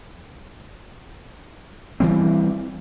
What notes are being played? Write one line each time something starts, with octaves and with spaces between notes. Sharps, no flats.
E3 G3 C4